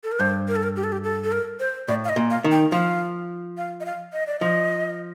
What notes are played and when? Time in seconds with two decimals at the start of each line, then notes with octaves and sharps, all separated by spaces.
0.04 A4
0.12 A#4
0.20 G2 C5
0.48 A#4
0.56 A4
0.63 A#4
0.76 G4
0.84 A4
0.92 G4
1.04 A4
1.24 A4
1.32 A#4
1.60 C5
1.88 A2 D5
2.05 F5
2.09 D#5
2.16 A#2
2.30 F5
2.44 D#3
2.51 G5
2.72 F3 F5
3.57 F5
3.80 D#5
3.85 F5
4.13 D#5
4.27 D5
4.40 F3 D#5